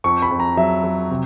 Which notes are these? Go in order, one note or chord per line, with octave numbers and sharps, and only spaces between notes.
F2 C#6
B5
F2
A#5
F#3 E5
F#3
C3